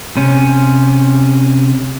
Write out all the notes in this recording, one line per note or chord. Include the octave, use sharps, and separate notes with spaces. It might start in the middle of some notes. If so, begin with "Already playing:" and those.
C3 C#4